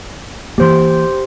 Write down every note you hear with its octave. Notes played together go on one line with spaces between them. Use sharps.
E3 A#3 G4 C5 C6